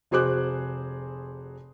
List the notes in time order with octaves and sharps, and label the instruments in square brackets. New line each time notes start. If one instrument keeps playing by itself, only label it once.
[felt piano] F1 F#4 G#4 C5 D6 F#6